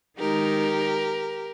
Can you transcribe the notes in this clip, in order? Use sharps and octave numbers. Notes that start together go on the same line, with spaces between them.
D#3 G#3 D#4 G4 A#4